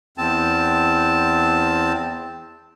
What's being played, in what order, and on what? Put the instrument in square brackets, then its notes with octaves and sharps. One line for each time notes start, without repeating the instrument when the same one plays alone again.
[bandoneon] E2 C4 A5